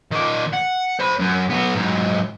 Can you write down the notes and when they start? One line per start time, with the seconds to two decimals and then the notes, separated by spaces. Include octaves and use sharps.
0.12 D#3 D5
0.53 F#5
1.00 C5 B5
1.20 F#2
1.50 F#3 B3
1.75 G#2 F#3